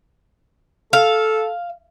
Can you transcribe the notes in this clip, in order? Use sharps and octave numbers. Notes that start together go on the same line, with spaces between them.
A4 F5